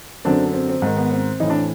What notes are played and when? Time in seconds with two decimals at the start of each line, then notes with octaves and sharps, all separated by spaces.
0.25 F#2 D3 C4 D4
0.53 C4
0.69 C4
0.82 G#2 D#3
0.97 B3
1.11 C4
1.40 A2 E3 D#4
1.50 D4